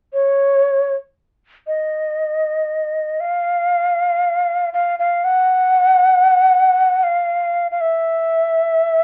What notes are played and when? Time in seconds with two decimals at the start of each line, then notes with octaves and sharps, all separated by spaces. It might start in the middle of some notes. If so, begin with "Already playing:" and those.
0.13 C#5
1.67 D#5
3.20 F5
4.73 F5
4.99 F5
5.24 F#5
7.03 F5
7.71 F5
7.81 E5